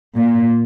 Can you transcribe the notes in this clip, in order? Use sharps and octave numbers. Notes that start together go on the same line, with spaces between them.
A#2